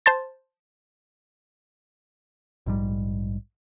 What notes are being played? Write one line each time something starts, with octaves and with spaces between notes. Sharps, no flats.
C5 A5 C6 A6
A#1 G#2 G3